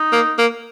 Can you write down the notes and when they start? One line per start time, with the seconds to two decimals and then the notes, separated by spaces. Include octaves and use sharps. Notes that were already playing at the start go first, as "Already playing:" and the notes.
Already playing: D#4
0.12 A#3
0.38 A#3